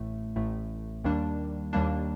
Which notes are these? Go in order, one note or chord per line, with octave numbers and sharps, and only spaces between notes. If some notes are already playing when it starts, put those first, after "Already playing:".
Already playing: A1 A2 A3
A1 A2 A3
D#2 D#3 G3 A#3 D4
D#2 D#3 G3 A#3 D4